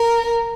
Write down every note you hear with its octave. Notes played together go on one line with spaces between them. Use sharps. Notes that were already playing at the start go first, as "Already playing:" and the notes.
Already playing: A#4